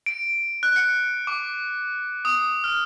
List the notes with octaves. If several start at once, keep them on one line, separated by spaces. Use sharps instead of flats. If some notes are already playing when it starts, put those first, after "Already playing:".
D7
F#6
C#7
D6
D#6
F6